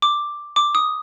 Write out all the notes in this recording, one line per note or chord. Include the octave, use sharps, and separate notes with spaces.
D6
D6
D#6